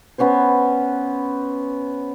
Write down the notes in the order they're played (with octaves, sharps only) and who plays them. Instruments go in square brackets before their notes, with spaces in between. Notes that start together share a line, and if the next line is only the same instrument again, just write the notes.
[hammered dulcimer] B3 C#4 B4 C5